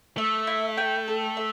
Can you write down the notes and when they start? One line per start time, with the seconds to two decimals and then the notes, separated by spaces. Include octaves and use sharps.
0.17 A3 E5
0.47 E4
0.77 G5
1.08 A4
1.37 E5